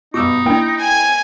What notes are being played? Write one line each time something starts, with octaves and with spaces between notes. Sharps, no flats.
G2 B2 D#4 C#6 D6 E6
A#3 D4 E4 G5
G#5 G#6